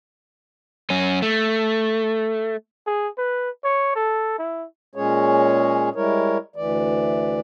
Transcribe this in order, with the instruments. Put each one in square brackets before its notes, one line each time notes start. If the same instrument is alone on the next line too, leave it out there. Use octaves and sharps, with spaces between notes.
[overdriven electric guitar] F#2 C#4
A3
[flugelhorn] G#4
B4
C#5
A4
E4
[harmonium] A#2 G#3 C#4 G#4 C#5
G3 G#3 E4 A#4 C#5
D2 E3 D5